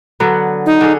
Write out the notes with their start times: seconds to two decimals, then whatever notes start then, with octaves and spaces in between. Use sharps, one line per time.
0.20 D3 F#3 B3
0.66 D#4
0.81 D3 C#4 G#4